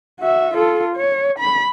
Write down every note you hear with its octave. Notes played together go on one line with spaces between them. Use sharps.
F#4 E5
F4 A4
C#5
B5